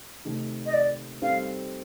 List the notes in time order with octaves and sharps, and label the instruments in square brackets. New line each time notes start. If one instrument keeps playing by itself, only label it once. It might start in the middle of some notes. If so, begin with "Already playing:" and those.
[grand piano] C3 D#3 A3
[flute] D#5
D5
[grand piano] G3 C4 D#4 A4 [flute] F5